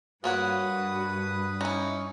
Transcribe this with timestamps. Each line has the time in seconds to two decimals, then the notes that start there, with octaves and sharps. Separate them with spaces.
0.24 G2 A#3 F#4 B4 C#5 F#5 D#6
1.61 C#4 D#4 E4